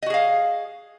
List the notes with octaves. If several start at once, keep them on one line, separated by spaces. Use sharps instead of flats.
F#4 G#4 D#5 F5